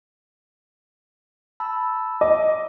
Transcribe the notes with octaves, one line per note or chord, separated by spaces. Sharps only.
A5 B5 E6
D#5 D6